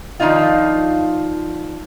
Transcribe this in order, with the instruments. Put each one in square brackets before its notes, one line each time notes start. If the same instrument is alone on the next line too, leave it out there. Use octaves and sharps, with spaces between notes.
[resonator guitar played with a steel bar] D#3 F3 D4 D#4 F4